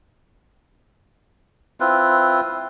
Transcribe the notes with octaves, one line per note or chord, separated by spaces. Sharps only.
C4 E4 F4 B4